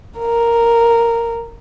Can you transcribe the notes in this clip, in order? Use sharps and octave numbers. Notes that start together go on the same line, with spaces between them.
A#4